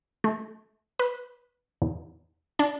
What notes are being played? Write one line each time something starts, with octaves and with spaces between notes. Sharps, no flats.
A3
B4
E2
D4